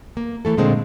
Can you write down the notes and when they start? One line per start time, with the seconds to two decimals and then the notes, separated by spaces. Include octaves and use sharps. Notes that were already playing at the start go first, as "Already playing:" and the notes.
0.17 A#3
0.45 E3 A3 A4
0.57 A#2 D3 G#3 C4